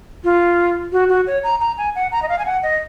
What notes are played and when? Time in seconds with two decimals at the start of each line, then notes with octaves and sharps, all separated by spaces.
0.24 F4
0.92 F#4
1.09 F#4
1.27 C#5
1.43 A#5
1.60 A#5
1.78 G#5
1.95 F#5
2.12 A#5
2.22 D#5
2.29 F5
2.39 G#5
2.45 F#5
2.63 D#5